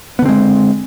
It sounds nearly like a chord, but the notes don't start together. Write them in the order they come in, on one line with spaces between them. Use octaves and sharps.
B3 D3 C4 G#3